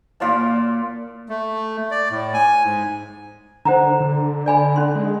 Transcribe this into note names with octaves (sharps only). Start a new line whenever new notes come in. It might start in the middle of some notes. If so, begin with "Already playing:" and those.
A#2 F4 D5 A5
A3
D5
A2
G#5
G#2
D3 C5 F#5 A#5
D3
D5 G#5 B5
C#4 C6
G#3